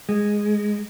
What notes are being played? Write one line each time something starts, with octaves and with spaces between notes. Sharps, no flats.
G#3